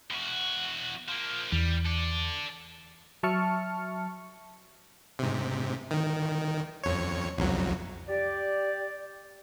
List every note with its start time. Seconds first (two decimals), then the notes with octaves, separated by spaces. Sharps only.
0.10 E2 F#4
1.08 F3 A#3
1.52 E2 G3
1.86 A4 D5
3.23 F#3 E5 A5 C#6 F6 C#7
5.19 G#2 C3
5.91 D#3
6.84 F2 C#5
7.38 C2 F2 F#3
8.09 G4 D5